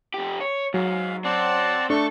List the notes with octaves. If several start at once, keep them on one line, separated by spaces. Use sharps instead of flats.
F2 G4
C#5
G#2 F#3 F5
C4 D5 F#5 A5
A3 D4 A4 C#6